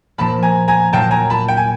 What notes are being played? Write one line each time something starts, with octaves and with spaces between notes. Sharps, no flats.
A#2 F3 A#3 A5 B5
G#5 A#5
G#5 A#5
A#2 F#3 A#3 G5 A5
G#5 A#5
A5 B5
G5
G#5